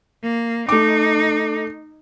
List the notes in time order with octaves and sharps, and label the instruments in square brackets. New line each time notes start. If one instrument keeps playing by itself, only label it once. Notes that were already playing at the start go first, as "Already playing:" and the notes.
[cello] A#3
[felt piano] A3 D6 [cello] D#4